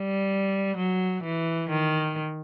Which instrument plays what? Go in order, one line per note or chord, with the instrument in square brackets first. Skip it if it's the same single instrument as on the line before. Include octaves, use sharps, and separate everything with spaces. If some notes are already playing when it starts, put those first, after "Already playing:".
Already playing: [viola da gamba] G3
F#3
E3
D#3